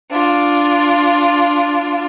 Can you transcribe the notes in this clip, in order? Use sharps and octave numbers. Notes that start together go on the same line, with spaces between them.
D4 F4